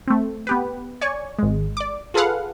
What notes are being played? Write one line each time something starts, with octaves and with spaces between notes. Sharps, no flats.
A3 C4
B3 G4 B4
C#5 D5 G#5 C#6
G#1 G#3
D5 D6
F4 G#4 A4 B4 F5 F#5